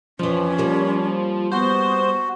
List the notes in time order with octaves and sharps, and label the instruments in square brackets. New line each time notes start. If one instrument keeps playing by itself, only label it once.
[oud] F2 E3 [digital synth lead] F3 [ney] C#4
[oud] G3 A#3
[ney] B3 [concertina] F#4 [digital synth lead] C5